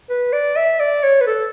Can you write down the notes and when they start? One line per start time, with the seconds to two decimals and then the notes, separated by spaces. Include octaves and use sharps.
0.10 B4
0.32 D5
0.56 E5
0.80 D5
1.03 C#5
1.21 B4
1.27 A4